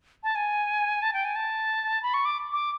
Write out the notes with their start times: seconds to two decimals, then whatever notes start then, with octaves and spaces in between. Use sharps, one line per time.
0.23 A5
0.35 G#5
1.02 A5
1.14 G5
1.25 G#5
1.36 A5
2.03 B5
2.14 C#6
2.25 D6
2.53 D6